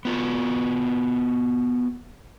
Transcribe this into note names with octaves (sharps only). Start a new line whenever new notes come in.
B3 F4 F#4